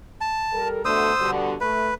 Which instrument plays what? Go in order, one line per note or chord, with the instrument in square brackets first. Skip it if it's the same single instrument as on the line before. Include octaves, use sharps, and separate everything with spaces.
[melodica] A5
[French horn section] G3 A4 A#4
[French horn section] B2 D3 A3 [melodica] C5 D#6 E6
[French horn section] B2 D3 G3
[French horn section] A3 [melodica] B4